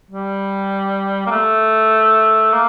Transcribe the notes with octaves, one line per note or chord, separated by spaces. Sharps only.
G3
A#3
A3
A#3